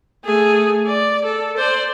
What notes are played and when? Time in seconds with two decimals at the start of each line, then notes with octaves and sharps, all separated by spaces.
0.25 A3 G#4
0.87 D5
1.24 A4
1.57 C5 D5